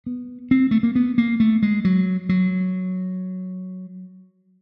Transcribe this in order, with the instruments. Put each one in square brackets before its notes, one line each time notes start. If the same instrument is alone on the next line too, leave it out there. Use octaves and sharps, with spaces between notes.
[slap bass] B3
C4
A3
A#3
B3
A#3
A3
G#3
F#3
F#3